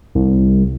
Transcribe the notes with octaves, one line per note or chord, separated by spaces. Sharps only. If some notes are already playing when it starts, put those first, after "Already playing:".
C2